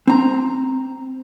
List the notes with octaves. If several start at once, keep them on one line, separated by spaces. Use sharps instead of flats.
C4 A#5